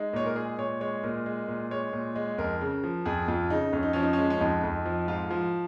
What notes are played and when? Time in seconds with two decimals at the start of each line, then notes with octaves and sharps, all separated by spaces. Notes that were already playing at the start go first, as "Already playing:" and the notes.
Already playing: G#3 D#4
0.13 A#2 C#5
0.26 A#4
0.36 G#3 G#4
0.58 A#2 C#5
0.81 G#3 C#5
1.03 A#2 A#4
1.26 G#3
1.48 A#2
1.71 G#3 C#5
1.93 A#2
2.16 G#3
2.38 F2 A#4
2.61 C#3
2.84 F3
3.05 F2 G#4
3.28 F2 F4
3.50 C#3 D#4
3.73 F2 C#4
3.83 D#4
3.93 F3 C#4
4.03 D#4
4.13 C#4
4.19 G#3
4.30 C#4
4.41 F2 D#4
4.63 F2
4.85 F3
5.08 G#2 F4
5.31 F3